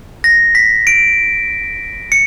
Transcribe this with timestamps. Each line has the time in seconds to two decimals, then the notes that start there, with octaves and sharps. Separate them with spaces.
0.24 A#6
0.55 B6
0.87 D7
2.12 C#7